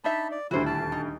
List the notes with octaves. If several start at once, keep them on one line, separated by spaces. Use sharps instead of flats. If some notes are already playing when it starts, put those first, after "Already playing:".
D4 D#4 E5 A5 B5
D5
D#1 D2 E4 F#4 C5
E4 A5
D#4